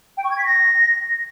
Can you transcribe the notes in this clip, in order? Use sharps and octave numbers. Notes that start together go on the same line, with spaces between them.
G5
C#6
G#6
B6
A#6